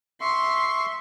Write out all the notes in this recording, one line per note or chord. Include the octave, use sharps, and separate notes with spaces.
E5 C6 C#6